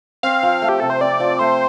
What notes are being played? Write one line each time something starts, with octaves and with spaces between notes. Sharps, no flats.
C4 F5
F3
A3
G4
C3 A4
C5
C4 D5
F3
A3 C5